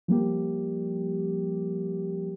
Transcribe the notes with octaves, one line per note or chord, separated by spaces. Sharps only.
F3 G3 A#3 G4